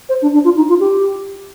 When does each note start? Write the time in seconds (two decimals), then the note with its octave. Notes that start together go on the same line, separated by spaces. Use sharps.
0.09 C5
0.22 D4
0.34 D4
0.44 F4
0.56 D#4
0.69 F4
0.80 G4